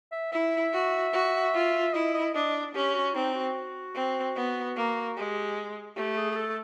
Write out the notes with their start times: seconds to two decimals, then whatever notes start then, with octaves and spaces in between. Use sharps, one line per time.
0.12 E5
0.32 E4 E5
0.73 F#4
1.13 F#4
1.54 F4
1.94 E4 D#5
2.14 D#5
2.34 D4 D#5
2.75 C#4 G4
2.94 F#4
3.14 C4 D#4
3.35 F#4
3.95 C4
4.36 B3
4.76 A#3
5.17 G#3 G4
5.96 A3 G4
6.17 G#4
6.32 G#4
6.37 A4